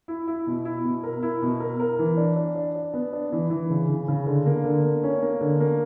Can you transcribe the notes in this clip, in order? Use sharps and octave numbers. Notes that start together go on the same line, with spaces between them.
E4
E4
B2
E4
B2
A#4
E4
B2
A#4
A#4
E3
D4
D4
D4
D4
B3
D4
E3
E3
C#3
C#3
C#3
D3
A#3
D3
A#3
C#4
A#3
D3
A#3